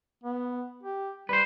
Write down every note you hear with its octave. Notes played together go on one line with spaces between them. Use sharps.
B3
G4
G3 B4 C5